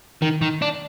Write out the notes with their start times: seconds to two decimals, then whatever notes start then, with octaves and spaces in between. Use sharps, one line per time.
0.22 D#3
0.41 D#3
0.62 D4